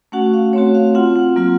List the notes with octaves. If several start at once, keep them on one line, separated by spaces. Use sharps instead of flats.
A3 C#4 F#4 F#5
F5
A3 C4 F#4 C#5
F5
C4 F4 F#5
F#5
F#3 A#3 F4